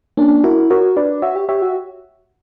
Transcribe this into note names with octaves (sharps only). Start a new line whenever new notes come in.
A#3 C#4 D4
E4 F#4 A#4
F#4 A#4 C#5
D4 B4 D5
F#4 C#5 E5
G4
G4 C#5 E5
F#4